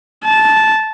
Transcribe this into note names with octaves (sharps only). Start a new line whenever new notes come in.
A5